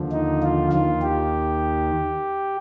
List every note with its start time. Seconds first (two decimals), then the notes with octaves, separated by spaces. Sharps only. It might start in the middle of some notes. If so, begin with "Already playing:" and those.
Already playing: D#2 D3 F3
0.12 D#4
0.43 F4
0.71 D#2 D#3 F4
1.02 G4